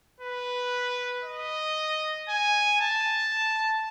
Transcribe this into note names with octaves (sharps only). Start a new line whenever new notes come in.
B4
D#5
G#5
A5